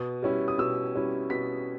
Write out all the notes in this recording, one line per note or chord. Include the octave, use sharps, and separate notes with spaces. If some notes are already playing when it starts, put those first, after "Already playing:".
Already playing: B2 D#6
G3 C#4 E4
D#6
B2 E6
G3 C#4 E4
B2 B6